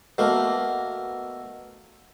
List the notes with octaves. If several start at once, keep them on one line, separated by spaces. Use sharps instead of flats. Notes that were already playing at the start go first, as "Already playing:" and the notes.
B2 A3 A#3